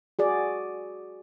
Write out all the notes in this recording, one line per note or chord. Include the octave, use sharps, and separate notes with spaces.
F#4 G#4 D5